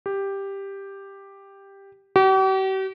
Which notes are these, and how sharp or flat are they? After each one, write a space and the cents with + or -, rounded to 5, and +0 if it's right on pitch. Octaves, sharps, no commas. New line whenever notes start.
G4 +5
G4 -45